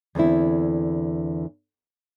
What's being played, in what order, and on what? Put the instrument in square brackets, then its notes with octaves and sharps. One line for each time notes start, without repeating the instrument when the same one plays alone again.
[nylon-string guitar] E2 D3 C4 E4